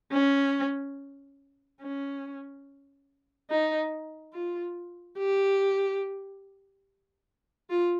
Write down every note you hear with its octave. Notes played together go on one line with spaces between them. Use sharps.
C#4
C#4
D#4
F4
G4
F4